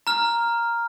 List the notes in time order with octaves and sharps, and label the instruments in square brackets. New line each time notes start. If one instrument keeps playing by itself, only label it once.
[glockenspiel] A#5 F6